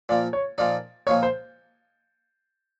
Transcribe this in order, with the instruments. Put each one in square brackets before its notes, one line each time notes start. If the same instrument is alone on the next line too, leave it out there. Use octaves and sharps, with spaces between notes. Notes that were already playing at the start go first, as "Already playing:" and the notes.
[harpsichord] A#2 F3 A#3 [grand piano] D5
[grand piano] C#5
[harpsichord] A#2 F3 A#3 D#4 [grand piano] D5
[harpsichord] A#2 F3 A#3 D#4 [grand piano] C#5
[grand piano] C5